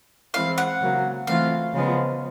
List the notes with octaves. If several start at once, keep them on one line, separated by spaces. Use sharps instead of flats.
E3 G#3 C4 E4 F5
F#5
C#3 F#3 A#3
E3 A3 C4 F4 F5
C#3 F3 G#3 B3